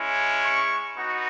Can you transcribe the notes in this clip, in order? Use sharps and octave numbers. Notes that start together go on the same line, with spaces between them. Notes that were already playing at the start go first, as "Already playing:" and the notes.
Already playing: G#3 C#4 E4
C#6
B3 D#4 F#4